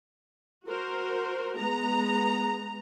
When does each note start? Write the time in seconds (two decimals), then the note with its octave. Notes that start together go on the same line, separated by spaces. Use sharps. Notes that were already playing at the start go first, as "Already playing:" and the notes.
0.66 F#4 A#4 C5
1.56 G#3 B3 A#5